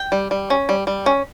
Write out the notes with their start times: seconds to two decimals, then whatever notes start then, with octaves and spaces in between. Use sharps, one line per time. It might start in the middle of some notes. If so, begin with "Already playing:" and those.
Already playing: G5
0.12 G3
0.31 G3
0.50 C#4
0.69 G3
0.87 G3
1.06 C#4